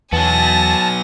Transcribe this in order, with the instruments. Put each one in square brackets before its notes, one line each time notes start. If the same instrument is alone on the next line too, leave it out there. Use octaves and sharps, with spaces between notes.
[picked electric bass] E2 [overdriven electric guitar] F#3 B3 [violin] G#5 A#6 [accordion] A5